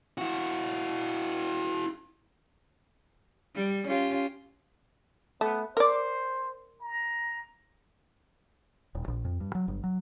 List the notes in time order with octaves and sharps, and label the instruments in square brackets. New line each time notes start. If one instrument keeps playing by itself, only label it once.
[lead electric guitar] E4 F#4
[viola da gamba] G3
C#4 F4 G4
[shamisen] A3 [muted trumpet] B3
[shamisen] A#4 D5 [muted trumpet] C5
[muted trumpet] A#5
[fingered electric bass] D#1
A#1
F2
G2
F#3
G1
F#3